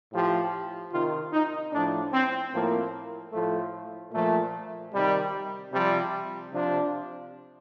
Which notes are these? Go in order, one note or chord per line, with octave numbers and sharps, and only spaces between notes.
A2 F3 G4
C3 D#3 F4
D#4
A2 F3 D4
C4
A2 F3 A#3
A2 F3 A3
A#2 F3 A3
C3 D#3 G3
C3 F3 G3
C3 F3 D4